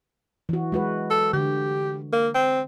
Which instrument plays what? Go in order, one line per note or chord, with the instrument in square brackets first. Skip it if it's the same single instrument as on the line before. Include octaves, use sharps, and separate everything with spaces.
[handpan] E3 F#4
G#3 F#4 B4
[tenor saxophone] A4
[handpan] D3 [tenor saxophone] G4
[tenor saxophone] A#3
C4